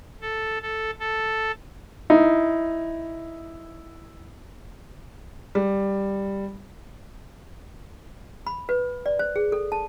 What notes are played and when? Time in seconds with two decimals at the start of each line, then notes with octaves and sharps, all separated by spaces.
0.21 A4
0.62 A4
0.99 A4
2.10 D#4 E4
5.55 G3
8.47 B5
8.69 B4
9.06 D5
9.19 C5
9.36 G#4
9.52 A4
9.72 A5